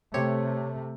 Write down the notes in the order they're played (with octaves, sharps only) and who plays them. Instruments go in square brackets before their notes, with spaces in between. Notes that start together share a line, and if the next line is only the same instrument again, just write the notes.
[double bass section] C3 A3 [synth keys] C4 G4 C#5